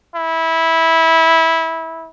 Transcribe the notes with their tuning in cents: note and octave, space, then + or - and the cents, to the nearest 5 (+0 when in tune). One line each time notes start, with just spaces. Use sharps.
E4 -15